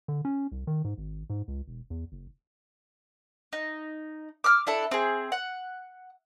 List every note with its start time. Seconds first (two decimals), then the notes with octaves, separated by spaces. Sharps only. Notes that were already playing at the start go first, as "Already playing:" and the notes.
0.08 D3
0.25 C#4
0.52 C2
0.67 D#3
0.84 G#2
0.98 G#1
1.30 G#2
1.48 C#2
1.68 E1
1.90 E2
2.12 F#1
3.53 D#4
4.44 D6 E6 F6
4.67 D4 E4 A4
4.91 C4 G#4
5.32 F#5